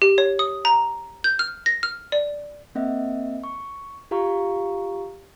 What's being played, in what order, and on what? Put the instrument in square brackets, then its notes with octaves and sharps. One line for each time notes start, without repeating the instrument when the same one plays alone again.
[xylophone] G4
C#5
D#6
A#5
G6
F6
A#6
F6
D5
[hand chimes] A#3 C4 D#5 E5
C#6
F4 G4 F5 A#5 C#6